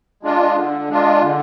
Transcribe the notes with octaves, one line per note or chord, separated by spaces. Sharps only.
G#3 D4 F4
D3
G#3 D4 F4
D3